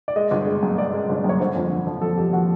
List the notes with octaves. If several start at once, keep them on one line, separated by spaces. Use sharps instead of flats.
D5
G#3 D#5
G1
G#3
F#2
G#3 D5
G#3
G1
F#2 C#5
D3 C5
F2
D3
F3
F2 A4
F2 G4
F3 F#4